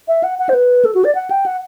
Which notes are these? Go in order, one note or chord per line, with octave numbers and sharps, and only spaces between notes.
E5
F#5
F#5
C5
B4
A4
F#4
D5
F#5
G5
F#5